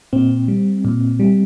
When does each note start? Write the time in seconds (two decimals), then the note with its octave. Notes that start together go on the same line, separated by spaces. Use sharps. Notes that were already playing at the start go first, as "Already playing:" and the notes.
0.13 A#2 C4
0.48 G3
0.85 A#2
1.20 G3